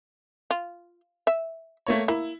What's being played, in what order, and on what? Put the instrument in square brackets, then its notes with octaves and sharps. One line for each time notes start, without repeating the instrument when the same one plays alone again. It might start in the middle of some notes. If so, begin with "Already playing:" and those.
[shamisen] F4
E5
[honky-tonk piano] A3 A#3 C#5
[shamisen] A#3 [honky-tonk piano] E4